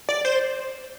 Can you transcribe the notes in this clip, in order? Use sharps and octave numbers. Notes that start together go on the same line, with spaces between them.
D5
C5